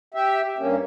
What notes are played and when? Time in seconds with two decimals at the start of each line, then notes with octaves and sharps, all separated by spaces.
0.14 G4 E5
0.58 G2 A#3 C#4